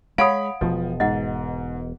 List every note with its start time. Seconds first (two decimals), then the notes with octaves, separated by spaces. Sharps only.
0.18 G#3 C#5 F5 F#5 B5 D#6 D7
0.61 E1 B2 F3
1.00 G#2 D#5 F#5